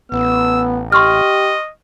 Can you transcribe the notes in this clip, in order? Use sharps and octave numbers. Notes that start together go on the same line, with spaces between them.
A1 B3 E6
G4 D#5 C6 C#6 F6